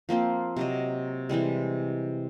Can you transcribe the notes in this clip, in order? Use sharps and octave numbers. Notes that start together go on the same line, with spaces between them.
F3 A#3 C4 F4
C3 F#3 D#5
C3 E3 G3 G#3